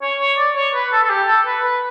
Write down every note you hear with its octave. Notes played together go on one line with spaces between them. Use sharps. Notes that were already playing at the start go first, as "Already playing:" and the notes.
C#5
C#5
D5
C#5
B4
A4
A4
G4
A4
B4
B4